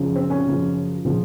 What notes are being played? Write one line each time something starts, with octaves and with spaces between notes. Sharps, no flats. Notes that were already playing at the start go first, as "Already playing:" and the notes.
Already playing: F#2 C#3 F3
C4
C#4
F#2 C#3 F3
C#3 F3